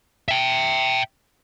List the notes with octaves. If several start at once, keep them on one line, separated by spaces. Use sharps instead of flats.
E5 G5